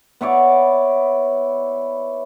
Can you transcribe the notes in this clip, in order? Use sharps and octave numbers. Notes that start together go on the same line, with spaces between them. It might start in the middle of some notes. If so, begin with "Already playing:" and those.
B3 E4 C#5 D5